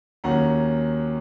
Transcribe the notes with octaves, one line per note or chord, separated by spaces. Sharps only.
D#2 D#3 F#3 C#4 F#5 A#5